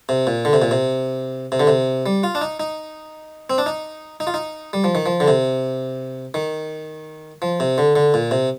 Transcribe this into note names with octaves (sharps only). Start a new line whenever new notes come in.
C3
A#2
D3
C3
A#2
C3
C3
D3
C3
G3
F4
D4
D#4
D#4
C4
D4
D#4
D#4
F4
D#4
G3
F3
D#3
F3
D3
C3
D#3
F3
C3
D3
D3
A#2
C3